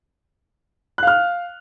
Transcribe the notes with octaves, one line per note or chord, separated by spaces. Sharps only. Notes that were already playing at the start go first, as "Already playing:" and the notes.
F5 F6 F#6